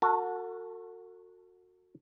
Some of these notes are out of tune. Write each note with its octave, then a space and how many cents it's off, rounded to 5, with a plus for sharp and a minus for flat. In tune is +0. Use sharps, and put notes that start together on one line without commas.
F#4 -20 A4 +45 A5 +0